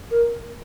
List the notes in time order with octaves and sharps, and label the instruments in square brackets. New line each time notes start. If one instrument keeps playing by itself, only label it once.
[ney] A#4